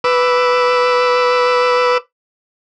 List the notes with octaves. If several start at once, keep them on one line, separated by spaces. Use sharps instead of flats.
B4 D6 E6